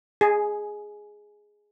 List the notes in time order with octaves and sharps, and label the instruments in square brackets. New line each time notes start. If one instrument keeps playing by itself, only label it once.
[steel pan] G#4